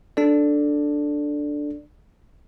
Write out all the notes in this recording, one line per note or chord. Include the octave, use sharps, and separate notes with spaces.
D4 A4 D5